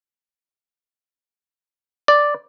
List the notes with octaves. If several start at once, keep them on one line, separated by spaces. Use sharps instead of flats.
D5